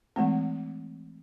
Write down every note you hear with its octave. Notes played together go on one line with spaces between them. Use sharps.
E3 G#3 A3 C4